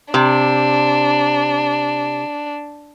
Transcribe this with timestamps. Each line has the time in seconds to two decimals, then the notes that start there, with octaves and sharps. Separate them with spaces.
0.14 C3 D4